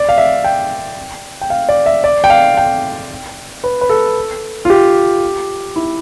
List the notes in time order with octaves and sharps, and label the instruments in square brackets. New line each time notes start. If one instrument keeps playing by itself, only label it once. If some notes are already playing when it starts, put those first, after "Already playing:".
Already playing: [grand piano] D5
F5
E5
G5
G5
F5
D5
E5
D5
G5
F5
G5
B4
B4
A4
F4
G4
E4